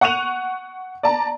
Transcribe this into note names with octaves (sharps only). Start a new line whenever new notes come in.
F#5 C#6 F#6 D#7 F7
D5 A5 A#5